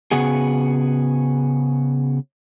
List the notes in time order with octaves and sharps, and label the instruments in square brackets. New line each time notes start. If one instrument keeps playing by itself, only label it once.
[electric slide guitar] C#3 B3 F#4 G#4